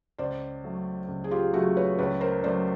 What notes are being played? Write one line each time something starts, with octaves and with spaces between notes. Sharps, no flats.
C#2 C5 D5
C#3 F#3 A3
C#2
G#4
F4 G4
C#3 F#3 A3 F#4 G#4
B4 C#5
C#2 B4 C#5
A#4 C5
C#3 F#3 A3 C5 D5